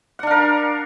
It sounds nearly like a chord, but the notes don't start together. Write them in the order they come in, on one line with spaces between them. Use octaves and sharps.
F#5 D4 F5 A#4